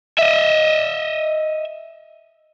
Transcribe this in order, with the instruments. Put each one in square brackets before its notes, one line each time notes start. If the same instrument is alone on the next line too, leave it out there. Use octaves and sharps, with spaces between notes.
[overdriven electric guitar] D#5 E5